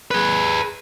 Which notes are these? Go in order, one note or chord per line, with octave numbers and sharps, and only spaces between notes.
G#4 B4